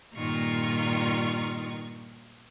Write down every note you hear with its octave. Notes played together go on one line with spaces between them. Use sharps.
G2 A#2 D#3 F4 A#5 C#6